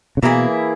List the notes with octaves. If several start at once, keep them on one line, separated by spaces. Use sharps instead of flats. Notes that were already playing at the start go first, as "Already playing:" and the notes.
C#3
B2 E3 A#3 E4 G#4